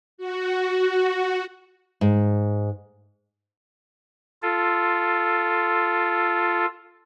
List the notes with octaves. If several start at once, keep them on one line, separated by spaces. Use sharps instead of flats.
F#4
G#2
F4 A4